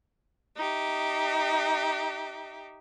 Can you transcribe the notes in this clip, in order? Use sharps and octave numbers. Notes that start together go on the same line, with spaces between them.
D#4 G4 E5